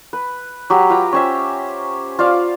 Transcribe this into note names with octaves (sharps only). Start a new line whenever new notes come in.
B4
F#3 G4
F4 B4 G5 A#5
C#4 C5 E5
F4 C5 D5 F5